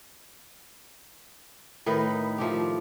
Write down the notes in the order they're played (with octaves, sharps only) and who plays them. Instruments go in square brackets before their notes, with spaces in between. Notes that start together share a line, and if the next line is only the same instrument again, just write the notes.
[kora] A2 D#3 D#4 B4
F3 A3 G4